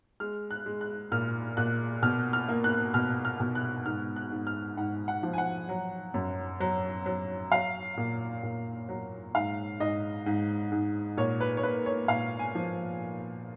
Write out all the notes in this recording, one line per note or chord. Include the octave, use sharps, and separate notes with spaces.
G#3 F6
F#6
G#3
F#6
A#2 F6
A#2 F#6
B2 F6
F6
A#3
F#6
B2 F6
F6
B2
F#6
G#2 F6
F#6
G#2
F6
G#2 F#5
F#5
F3
G#5
F#5
F#3
F#2
F#3
F#3
F#3 F5
A#2
A#2
F#3
G#2 F5
G#2 D#5
G#2
G#2
A#2 C#5
B4
C#5
A#3 B4
C#5
A#2 F5
G#5
F3